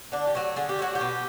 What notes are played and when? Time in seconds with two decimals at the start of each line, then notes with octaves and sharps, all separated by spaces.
0.12 D3 D4
0.27 G4
0.35 F#3 A3
0.56 D3 G#4
0.69 G4
0.79 F#3 A3 F#4
0.95 G4
1.01 B2